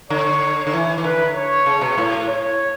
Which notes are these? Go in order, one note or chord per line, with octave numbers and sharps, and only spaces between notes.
D3 C#5
D3
E3
E3
D3 B4
C#5
C#3
B2
A2
C#5